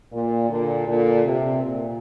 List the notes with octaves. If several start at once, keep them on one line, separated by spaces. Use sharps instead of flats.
A#2
A#2 D3
A#2 D3
C3
A#2